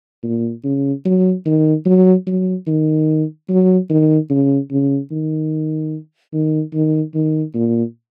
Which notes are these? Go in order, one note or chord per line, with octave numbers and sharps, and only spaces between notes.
A#2
C#3
F#3
D#3
F#3
F#3
D#3
F#3
D#3
C#3
C#3
D#3
D#3
D#3
D#3
A#2